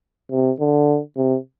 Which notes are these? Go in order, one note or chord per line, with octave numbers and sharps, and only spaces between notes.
C3
D3
C3